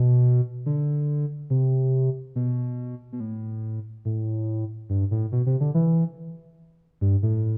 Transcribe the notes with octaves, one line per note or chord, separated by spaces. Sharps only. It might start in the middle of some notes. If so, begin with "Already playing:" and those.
Already playing: B2
D3
C3
B2
B2
A2
A2
G2
A2
B2
C3
D3
E3
G2
A2